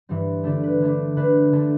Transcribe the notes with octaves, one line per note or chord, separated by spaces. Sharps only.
G2 E3 G3 C4
D3 A3 D4 A4
B4
D3 A3 D4
D3 A3 D4 B4
D3 A3 D4 A4